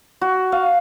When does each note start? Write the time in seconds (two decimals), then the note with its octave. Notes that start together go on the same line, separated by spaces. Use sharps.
0.21 F#4
0.52 F5